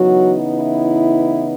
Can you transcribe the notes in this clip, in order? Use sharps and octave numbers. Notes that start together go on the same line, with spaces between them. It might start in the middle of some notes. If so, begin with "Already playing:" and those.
Already playing: C#3 E3 F#3 B3 D#4 F#4
E4